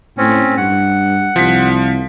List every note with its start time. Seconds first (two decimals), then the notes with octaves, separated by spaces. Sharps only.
0.18 A2 C4 C#4
0.57 G2 F#5
1.36 C2 F3 B6